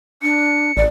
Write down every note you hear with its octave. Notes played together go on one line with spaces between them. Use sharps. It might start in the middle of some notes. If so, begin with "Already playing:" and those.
D4 C#7
A1 D5